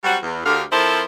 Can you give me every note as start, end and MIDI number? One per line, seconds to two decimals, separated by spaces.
0.04 0.17 54
0.04 0.17 55
0.04 0.17 60
0.04 0.17 66
0.23 0.39 40
0.45 0.63 38
0.45 0.63 50
0.45 0.63 67
0.45 0.63 70
0.45 0.63 77
0.71 1.02 53
0.71 1.02 60
0.71 1.02 64
0.71 1.02 69
0.71 1.02 70
0.71 1.02 72